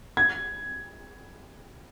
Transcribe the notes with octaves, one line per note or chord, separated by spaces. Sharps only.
G#6